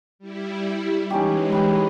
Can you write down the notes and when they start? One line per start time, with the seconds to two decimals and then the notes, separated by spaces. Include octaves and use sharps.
0.19 G3 E4
1.10 E3 G#3 C#4 D#4 G4
1.50 G4 B4 D#5